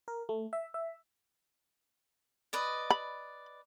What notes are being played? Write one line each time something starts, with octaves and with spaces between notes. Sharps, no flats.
A#4
A3
E5
E5
B4 D5 D#5
B5